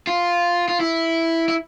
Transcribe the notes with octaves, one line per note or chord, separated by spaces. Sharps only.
F4
F4
E4
E4